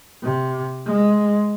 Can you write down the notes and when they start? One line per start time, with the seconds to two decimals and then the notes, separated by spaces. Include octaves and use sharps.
0.23 C3
0.86 G#3